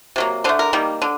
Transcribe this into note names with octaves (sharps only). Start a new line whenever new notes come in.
C3 F#3 A#3
D3 A3 C5
A#4
D#3 G3 A#3
D3